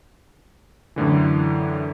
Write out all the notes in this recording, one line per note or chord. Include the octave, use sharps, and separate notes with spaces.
F#2 A2 D3 E3